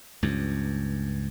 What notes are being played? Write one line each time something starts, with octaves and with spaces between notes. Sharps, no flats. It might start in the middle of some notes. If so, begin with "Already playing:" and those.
C#2 G2